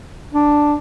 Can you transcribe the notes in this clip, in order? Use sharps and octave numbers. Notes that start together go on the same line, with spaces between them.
D4